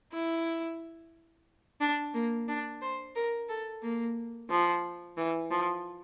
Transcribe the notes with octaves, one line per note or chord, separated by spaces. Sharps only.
E4
D4
A#3
D4
C5
A#4
A4
A#3
F3
E3
F3